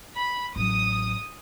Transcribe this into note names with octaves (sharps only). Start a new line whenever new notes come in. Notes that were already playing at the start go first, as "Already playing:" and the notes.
B5
A1 F#3 D#6